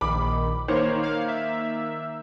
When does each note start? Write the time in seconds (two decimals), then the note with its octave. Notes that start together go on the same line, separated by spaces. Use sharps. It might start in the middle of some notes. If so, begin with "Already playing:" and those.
0.01 A#1 D#3 B5 D6
0.68 D#3 A#3 C5 C#5
1.03 F5
1.28 E5